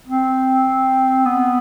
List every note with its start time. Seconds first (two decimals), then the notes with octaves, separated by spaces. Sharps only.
0.07 C4
1.25 B3